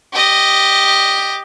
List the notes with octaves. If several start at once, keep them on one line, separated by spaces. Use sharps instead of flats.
G4 D#5